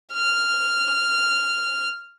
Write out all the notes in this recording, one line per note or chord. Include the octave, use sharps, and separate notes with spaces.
F6